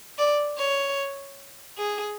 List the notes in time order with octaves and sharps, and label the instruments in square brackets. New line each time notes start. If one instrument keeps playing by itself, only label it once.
[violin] D5
C#5
G#4